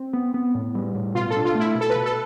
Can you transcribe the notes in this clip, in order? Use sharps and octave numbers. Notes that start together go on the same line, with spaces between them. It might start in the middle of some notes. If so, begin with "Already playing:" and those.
Already playing: C4
B3
B3
A2
G3
A2
B2 F4
A4
D4
F4
A3
E4
B2
A4
B4
B2
A4